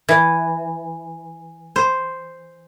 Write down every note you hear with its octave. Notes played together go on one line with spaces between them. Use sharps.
E3
C5